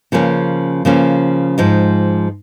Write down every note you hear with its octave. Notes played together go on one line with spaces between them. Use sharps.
C#3 F3 A#3 C#4
C#3 F3 A#3 C#4
G#2 F3 G#3